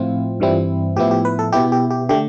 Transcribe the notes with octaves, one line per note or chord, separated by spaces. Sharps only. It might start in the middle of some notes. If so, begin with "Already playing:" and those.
Already playing: A2 F3 C4 E4 F4
G2 E3 G3 C4 E4
A2 F3 B3 E4 G4
G4
B4
A4
B2 B3 E4 G4
G4
G4
D3 A3 G4